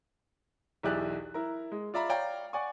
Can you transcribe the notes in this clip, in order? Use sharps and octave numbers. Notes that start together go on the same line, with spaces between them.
B1 E2 E4 G4 D5 F#6
E4 A#4 A#5
G#3
F4 D5 E5 A#5 B5
C#5 D5 F5 G5 A#5
D5 F#5 G#5 C#6